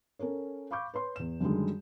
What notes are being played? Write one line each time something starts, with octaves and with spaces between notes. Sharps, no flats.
C#4 A4 A#4 C#5
F5 B5 C#6 D6 G6
B4 C#5 C6
E2 E7
F#2 D3 D#3 G3 G#3